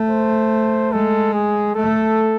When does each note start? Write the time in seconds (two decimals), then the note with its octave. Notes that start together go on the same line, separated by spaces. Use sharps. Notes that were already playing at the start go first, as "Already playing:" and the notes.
Already playing: A3
0.10 C5
0.93 G#3 A4
1.34 G#4
1.75 A3 A4